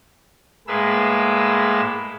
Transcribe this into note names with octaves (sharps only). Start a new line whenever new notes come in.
A2 G#3 A#3 G#4 B4 E6